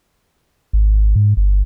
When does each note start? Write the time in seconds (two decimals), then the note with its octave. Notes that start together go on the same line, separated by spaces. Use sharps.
0.73 G#1
1.16 G#2
1.37 G1